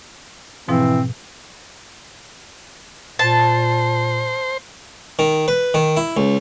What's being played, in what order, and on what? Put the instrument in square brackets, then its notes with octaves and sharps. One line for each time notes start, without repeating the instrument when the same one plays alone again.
[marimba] G#2 B2 F3 [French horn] E3 [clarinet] C4
[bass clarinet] A#2 [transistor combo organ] C5 [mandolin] A5
[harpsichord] D#3
B4
D#3
E4
C#2